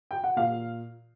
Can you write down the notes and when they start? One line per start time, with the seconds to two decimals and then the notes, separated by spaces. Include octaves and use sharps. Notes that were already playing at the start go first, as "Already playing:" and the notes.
0.11 G5
0.24 F#5
0.36 A#2 F5